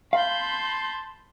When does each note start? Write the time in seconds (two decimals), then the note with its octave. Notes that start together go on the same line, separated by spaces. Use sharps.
0.13 F5 A5 B5 C6 G6